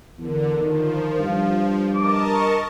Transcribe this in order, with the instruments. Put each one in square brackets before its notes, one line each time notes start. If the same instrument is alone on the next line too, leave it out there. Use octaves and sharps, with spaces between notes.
[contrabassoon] E2 [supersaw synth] D3 [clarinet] A#4
[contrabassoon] D#3 [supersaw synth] F3
[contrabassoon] G2 [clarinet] F5
[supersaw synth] A#4 D#5 A5 [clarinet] D6
[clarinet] C#6